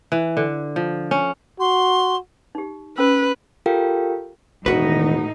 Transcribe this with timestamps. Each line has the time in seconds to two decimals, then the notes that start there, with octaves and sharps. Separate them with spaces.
0.12 E3
0.37 D3
0.76 F3
1.11 C#4
1.60 F#4 C6
2.55 D#4 G4
2.98 C#4 B4 E6
3.66 F4 G4 A4 A#4 F5 G5
4.66 E1 A2 D#3 D#4 F#4 B4